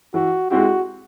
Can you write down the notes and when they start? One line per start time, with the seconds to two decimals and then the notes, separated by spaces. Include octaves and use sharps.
0.14 E3 F#4
0.50 G#3 C4 E4 F#4 G4